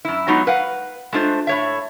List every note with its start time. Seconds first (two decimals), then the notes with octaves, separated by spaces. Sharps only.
0.05 F#2 E4
0.28 F#3 G#3 B3 D#4 F4
0.47 B4 F5 F#5
1.13 G#3 A3 D4 F4 C5
1.47 A2 C#5 E5